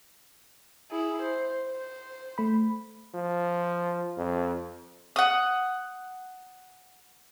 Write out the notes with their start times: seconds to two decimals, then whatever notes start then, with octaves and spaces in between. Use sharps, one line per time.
0.91 E4 G#4
1.22 C5
1.67 C5
2.38 A3 B5
3.15 F3
4.18 F2
5.16 F#5 D#6